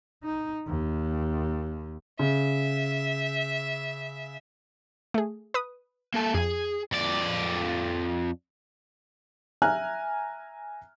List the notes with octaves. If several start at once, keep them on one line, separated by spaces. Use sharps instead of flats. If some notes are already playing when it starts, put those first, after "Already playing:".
D#4
D#2
C#3 E5
A3 G#4
B4 D#6
A#3 A4 A5
F2 G#4
F2 D5
E5 G#5 A#5 F6 F#6